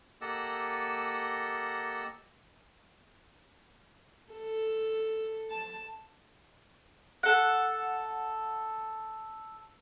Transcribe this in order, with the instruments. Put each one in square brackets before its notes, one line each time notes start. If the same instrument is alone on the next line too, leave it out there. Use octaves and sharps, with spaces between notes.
[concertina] A#3 G4 A4 D#5 F#5 E6
[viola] A4
A5
[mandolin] A4 F#5